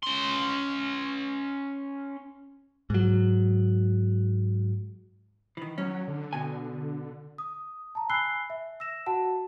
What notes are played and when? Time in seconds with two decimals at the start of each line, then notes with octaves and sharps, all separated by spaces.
0.03 C#4 C6
2.90 G#2 F#3
5.57 D#3 E3
5.78 F#3 C#4
6.08 D3
6.33 B2 G#5
7.38 D#6
7.95 A5 A#5
8.09 G#5 B5 E6 F#6 C7 G7
8.50 E5
8.80 E6 A#6 E7
9.06 F#4 F#5 A5